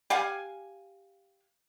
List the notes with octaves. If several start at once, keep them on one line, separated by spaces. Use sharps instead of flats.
G4 F5 F#5 G#5